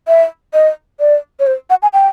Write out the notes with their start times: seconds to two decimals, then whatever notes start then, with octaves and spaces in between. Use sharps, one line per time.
0.08 E5
0.53 D#5
1.00 D5
1.39 C#5
1.47 C5
1.70 F#5
1.82 G#5
1.93 G5